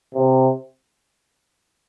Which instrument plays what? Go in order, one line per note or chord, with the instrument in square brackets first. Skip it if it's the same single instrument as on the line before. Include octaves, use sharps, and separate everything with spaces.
[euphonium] C3